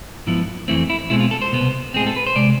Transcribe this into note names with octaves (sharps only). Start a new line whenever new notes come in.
G#2 F3 B3 E4
F2 E3 A3 C4 E4
E4
B2 G#3 C4 E4
F4
A4
C5
C2 B2 B3
A2 G#3 C4 G#4
A4
B4
C5
C3 G#3 D5